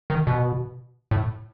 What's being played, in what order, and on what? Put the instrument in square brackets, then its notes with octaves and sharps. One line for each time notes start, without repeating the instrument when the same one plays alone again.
[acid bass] D#3
B2
A2